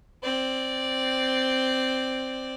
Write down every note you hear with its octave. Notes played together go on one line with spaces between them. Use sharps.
C4 D5